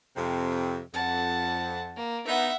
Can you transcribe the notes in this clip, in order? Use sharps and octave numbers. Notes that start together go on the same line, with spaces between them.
F2 C3
F2 F#5 A5
A#3
B3 D#4 E5 F#5